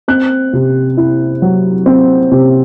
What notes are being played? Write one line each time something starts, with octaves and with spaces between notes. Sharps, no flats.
C4 F#6
C3
E4
F#3
C4
C3